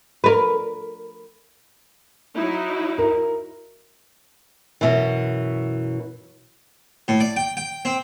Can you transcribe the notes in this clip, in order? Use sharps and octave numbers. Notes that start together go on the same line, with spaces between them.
A#4 B4
F#3 D#4 E4
A#4
F#2 B2 E3
A2
D5
G5
G5
C4